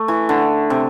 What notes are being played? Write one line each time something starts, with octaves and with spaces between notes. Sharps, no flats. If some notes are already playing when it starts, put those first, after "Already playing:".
Already playing: A3
E3
D3
C3